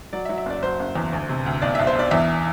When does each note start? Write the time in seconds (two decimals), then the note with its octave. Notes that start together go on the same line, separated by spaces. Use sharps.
0.13 F#3 D5
0.25 E5
0.29 F#3
0.38 E5
0.46 F#1 D5
0.63 F#3 C5
0.79 F#1
0.96 E2
1.13 D2
1.29 C3
1.46 D2
1.62 B1 D5
1.75 E5
1.79 B1
1.87 C5
1.95 B1 D5
2.11 E2 E5